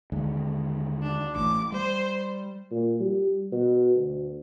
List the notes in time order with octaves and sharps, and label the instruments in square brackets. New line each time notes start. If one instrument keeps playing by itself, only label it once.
[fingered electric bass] D#2 D3 G#3
[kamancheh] D4
[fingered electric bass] A1 A2 [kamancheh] D6
[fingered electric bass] G3 [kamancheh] C5
[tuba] A#2
G3
B2
D2